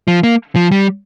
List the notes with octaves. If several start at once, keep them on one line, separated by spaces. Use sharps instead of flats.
F3
A#3
F3
G3